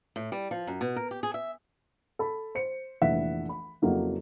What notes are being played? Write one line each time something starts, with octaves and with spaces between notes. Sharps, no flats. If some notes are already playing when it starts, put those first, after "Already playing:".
A2
G3
F3
F#2
B2
A#4
G4
G#4
E5
A4 B5
C5 C#7
F1 A#1 E3 E5 F#5 B6
B5
F2 C#3 F#3 A#3 E4